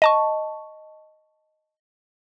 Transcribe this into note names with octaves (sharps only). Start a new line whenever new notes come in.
D#5 A5 C#6